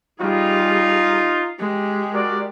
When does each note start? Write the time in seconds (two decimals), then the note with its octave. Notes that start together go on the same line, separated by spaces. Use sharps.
0.21 G3 D#4 F4 G#4
1.59 G#3 G4
2.13 F#4 A#4 D5